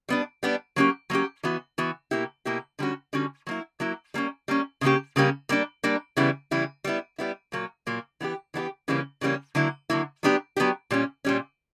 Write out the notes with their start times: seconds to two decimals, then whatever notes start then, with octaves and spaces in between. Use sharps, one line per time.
0.09 G3 B3 D4
0.43 G3 B3 D4
0.76 F#3 A#3 C#4 G4
1.10 F#3 A#3 C#4 G4
1.43 E3 B3 F#4
1.78 E3 B3 F#4
2.11 B2 A#3 E4 G4
2.45 B2 A#3 E4 G4
2.79 D3 G3 C#4 F#4
3.13 D3 G3 C#4 F#4
3.47 F#3 A#3 E4
3.80 F#3 A#3 E4
4.14 G3 A#3 C#4
4.48 G3 A#3 C#4
4.81 C#3 G3 A#3 C#4 G4
5.16 C#3 G3 A#3 C#4 G4
5.49 G3 A#3 D4
5.84 G3 A#3 D4
6.17 C#3 E3 G3 B3 E4
6.51 C#3 E3 G3 B3 E4
6.84 G3 B3 E4
7.18 G3 B3 E4
7.52 A#2 F#3 A#3
7.87 A#2 F#3 A#3
8.21 E3 B3 D4 G4
8.54 E3 B3 D4 G4
8.88 C#3 E3 G3 A#3 C#4
9.21 C#3 E3 G3 A#3 C#4
9.55 D3 F#3 A#3 E4
9.90 D3 F#3 A#3 E4
10.23 F#3 B3 D4 G4
10.56 F#3 B3 D4 G4
10.91 A#2 G3 C#4
11.25 A#2 G3 C#4